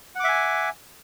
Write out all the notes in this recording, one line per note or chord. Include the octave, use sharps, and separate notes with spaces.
E5 F#5 G#5 D6